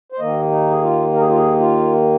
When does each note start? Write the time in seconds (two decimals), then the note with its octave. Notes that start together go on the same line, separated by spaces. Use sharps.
0.12 C5
0.19 D#2 D#3 A#3 D#5
0.51 D#4
0.71 G#4
0.82 F4
1.13 A#4
1.21 G#4
1.29 F4
1.37 G#4
1.60 F4